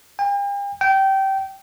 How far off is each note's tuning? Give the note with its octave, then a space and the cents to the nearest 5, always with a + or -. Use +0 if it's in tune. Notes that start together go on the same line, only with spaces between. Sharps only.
G5 +45
G5 -20